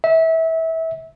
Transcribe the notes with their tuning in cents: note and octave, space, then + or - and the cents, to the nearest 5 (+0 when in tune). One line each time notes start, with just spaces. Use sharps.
E5 -25